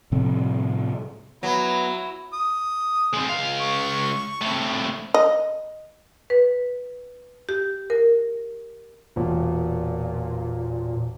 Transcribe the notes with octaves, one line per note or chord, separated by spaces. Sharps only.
A2 C3 F3 C4
F#3 B3 E4 A#5
D#6
G#3 C4
C#2 F5
C#6
A2 C3
D#5
B4
G4
A#4
E1 A#2